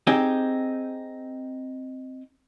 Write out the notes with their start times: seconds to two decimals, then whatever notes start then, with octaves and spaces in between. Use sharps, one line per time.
0.07 C4 D#4 G4 G#4